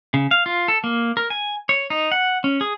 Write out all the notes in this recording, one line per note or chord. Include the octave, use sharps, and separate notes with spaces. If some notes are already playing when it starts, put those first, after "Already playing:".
C#3
F5
F4
A4
A#3
A#4
G#5
C#5
D#4
F#5
C#4
G#4